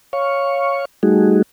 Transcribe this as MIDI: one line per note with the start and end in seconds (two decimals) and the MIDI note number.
0.13 0.85 73
0.13 0.85 77
0.13 0.85 85
1.03 1.42 55
1.03 1.42 57
1.03 1.42 63
1.03 1.42 66
1.03 1.42 68